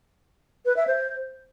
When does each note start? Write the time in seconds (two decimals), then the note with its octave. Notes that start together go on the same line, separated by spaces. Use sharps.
0.66 B4
0.76 E5
0.87 C5